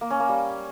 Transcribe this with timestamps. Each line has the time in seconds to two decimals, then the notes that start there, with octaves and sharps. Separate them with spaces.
0.01 A#3
0.10 C#4
0.20 A#3
0.29 G3